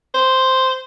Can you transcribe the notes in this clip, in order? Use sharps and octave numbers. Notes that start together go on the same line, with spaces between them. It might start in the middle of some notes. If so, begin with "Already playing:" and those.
C5